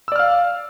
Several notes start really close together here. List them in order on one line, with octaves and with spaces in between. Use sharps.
E6 D5 F6 F5